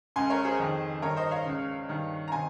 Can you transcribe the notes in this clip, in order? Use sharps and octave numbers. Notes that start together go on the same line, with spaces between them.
C#2 C#3 G#5 C6
A#4 C#5
G#4 C5
F2 D#3
G2 D#3 A#4 C#5
C5 D#5
C#5 F5
C#2 C#3
G2 D#3
A#5
C3 D#3 G#5 C6